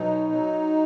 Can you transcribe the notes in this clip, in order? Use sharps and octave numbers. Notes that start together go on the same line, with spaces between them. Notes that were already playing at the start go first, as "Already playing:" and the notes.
Already playing: B2 F#3 D#4
F#3